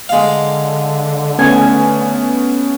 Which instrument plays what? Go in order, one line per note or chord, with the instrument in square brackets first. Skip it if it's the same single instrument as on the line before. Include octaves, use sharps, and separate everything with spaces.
[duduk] D3 [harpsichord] G#3 F5
[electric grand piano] A3 B3 C#4 [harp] G#5